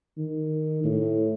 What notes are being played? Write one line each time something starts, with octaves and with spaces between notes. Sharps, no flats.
D#3
A2